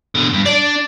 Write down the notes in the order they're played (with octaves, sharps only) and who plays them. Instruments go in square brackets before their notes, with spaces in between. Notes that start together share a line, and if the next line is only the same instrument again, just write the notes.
[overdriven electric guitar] B2 D3
G2
[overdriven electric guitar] D4 [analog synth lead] D5